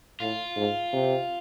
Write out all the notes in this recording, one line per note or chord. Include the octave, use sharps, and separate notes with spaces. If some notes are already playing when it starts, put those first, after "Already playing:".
A2 F4
G#2
C3